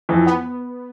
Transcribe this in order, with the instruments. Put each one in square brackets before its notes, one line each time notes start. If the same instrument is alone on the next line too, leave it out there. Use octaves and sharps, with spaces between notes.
[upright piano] F2 E3
[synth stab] B3